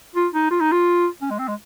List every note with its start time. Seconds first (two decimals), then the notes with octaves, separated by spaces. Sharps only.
0.15 F4
0.34 D#4
0.50 F4
0.61 D#4
0.72 F4
1.22 C#4
1.30 G#3
1.39 C4
1.48 G#3